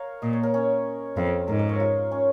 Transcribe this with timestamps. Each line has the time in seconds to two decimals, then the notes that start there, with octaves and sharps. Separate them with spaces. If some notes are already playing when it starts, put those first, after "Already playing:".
Already playing: A#4 C#5 F5
0.22 A#2 D#5
0.33 C#5
0.43 A#4
0.54 C#4
1.16 F2 F4
1.48 G#2 A#4
1.59 D#5
1.69 C#5
1.80 F4
2.12 C#4